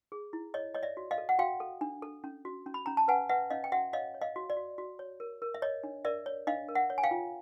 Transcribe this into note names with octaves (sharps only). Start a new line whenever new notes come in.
G#4
E4
C#5 D#5
C#5 D#5
D5 E5
F#4
D#5 F5
A4
F#5
F#4 F5 G5
A4
D4
A4
C#4
F#4
C#4
B5
C#4 A#5
A5
B4 F#5 G#5
B4 E5 F#5
C#4 D#5 F5
G5
F#4 E5 F#5
C#5 D#5 F5
C#5
D#5 F5
F#4
D5
F#4
F#4
C#5
A#4
A#4
E5
C#5 D#5
D4
A#4 D5 E5
C#5
D4 D#5 F5
A#4
E5 F#5
C#5
G#5
F5 G5
F4